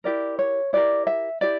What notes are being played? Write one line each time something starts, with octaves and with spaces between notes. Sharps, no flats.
E4 G4 A#4 D5
C#5
E4 G4 A#4 D5
E5
E4 G4 D5